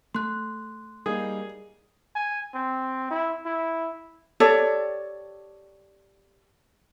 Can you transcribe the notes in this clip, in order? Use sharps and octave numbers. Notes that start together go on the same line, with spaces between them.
A3 C6 F#6
G3 A#3 D#4 G#4
G#5
C4
E4
E4
G4 A4 C#5 D5